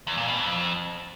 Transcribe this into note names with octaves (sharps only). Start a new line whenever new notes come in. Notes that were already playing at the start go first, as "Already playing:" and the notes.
E2
A#2
B2
F2